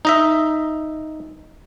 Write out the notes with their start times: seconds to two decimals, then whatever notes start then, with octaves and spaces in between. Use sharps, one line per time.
0.05 D#4 D#5 E5